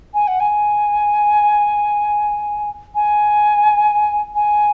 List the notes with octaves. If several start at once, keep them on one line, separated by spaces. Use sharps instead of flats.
G#5
F#5
G#5
G#5
G#5